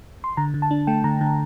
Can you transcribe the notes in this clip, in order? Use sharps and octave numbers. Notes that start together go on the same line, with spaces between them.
C6
D3 A#5
D3
A5
D4
A3 G5
D3 A#5
D3